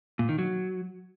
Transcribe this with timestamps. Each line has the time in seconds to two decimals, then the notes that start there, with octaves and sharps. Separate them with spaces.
0.19 A#2
0.29 D#3
0.39 F#3